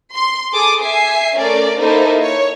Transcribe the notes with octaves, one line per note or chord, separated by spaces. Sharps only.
C6
G#4 A4 D6 D#6
E5 G#5 C7
A3 C#4 A#4 D5
A#3 D#4 E4 A4 A#4 C5
C#5